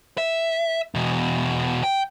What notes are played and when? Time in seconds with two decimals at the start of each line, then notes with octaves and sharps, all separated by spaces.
0.18 E5
0.95 E2 B2
1.84 G5